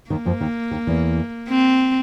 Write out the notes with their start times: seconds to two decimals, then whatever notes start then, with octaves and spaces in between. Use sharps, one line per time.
0.10 D#2 D#3 A#3
0.25 F2 F3
0.41 D#2 D#3
0.71 D#2 D#3
0.87 E2 E3
1.49 C4